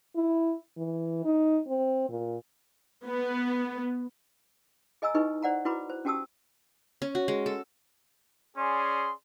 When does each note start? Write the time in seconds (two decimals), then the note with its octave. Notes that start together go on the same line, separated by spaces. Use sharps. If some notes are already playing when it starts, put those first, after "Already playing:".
0.16 E4
0.77 E3
1.25 D#4
1.68 C4
2.10 A#2
3.05 B3
5.02 G#4 D#5 G#5 A#5 E6
5.14 D#4 E4 G#4 B4 D#5 C#6
5.43 C5 D5 F#5 A#5
5.65 E4 F#4 B4 A#5 B5 D6
5.90 C5
6.05 C#4 F#4 G4 A5 D#6 E6
7.02 C#4
7.15 F#4
7.28 G#3
7.46 A4
8.57 C#4 G#4 D5 C6